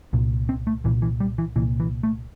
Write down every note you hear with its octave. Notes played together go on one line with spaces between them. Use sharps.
C2 A#2
C4
A3
C2 A#2 E3
E3
G3
E3
C2 A#2 E3
E3
A3